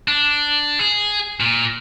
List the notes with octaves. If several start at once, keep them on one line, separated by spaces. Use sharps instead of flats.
D4
G#4
A#2